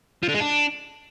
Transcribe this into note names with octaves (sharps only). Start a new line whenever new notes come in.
F3
D3
G#3
D4